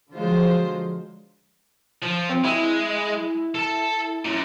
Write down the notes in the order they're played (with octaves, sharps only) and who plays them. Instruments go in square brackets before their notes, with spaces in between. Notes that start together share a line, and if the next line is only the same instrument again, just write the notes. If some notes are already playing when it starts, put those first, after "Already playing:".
[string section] D3 F3 F#3 G#3 F4 C5
[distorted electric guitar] F3
[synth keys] C4
[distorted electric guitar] G#3 [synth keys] E4
[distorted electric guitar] A4 A5
F#2 A#2